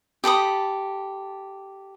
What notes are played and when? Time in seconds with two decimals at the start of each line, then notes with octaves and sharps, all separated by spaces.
0.24 G4 A4 B5 D#6